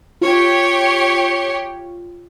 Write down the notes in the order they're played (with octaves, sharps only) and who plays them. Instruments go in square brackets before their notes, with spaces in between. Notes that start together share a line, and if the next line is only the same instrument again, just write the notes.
[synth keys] F4 [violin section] G4 C#5